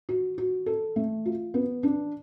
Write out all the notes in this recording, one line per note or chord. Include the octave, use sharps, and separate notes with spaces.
F#4
F#4
A4
A3
F4
B3
D4